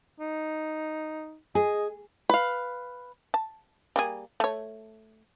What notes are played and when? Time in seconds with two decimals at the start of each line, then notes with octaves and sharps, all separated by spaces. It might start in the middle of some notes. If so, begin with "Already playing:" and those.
0.20 D#4
1.55 G#4 D#5
2.29 B4 F5
3.34 A5
3.96 G3 A#3 G#4
4.40 A3 C#5